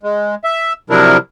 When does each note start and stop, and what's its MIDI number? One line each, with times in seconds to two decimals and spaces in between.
0.03 0.35 56
0.44 0.73 76
0.90 1.17 48
0.90 1.17 53
0.90 1.17 54
0.90 1.17 62
0.90 1.17 64
0.90 1.17 70